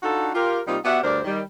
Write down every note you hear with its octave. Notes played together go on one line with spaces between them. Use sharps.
D4 D#4 F4 F#4 A4
F4 G4 A#4
C3 G3 A#3 D#4 F4
B3 F#4 G4 D5 E5 F#5
D2 G2 D4 A#4 C5 D5
D#3 G3